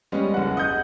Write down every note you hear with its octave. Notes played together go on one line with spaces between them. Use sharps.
G3 G#3 B3 C#4
F#1 F#5
D#5 F#5 D#6 G6